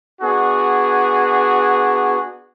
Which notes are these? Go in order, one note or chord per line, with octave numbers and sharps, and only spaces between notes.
B3 D4 F#4 G#4